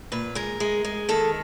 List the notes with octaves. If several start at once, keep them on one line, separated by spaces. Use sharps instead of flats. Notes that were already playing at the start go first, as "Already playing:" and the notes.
A#2 B4
G#3 A#4
G#3
G#3
D#3 A4